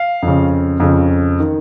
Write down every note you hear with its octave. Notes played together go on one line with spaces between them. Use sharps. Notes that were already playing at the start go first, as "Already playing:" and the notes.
Already playing: F5
F2
C#3
F2 C#3
D#3